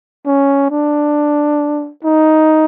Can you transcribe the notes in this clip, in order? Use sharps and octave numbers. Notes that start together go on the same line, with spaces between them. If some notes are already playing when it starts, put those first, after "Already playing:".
C#4
D4
D#4